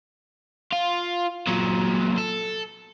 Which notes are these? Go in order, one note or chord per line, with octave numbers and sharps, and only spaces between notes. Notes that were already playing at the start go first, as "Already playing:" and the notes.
F4
A#2 F#3
A4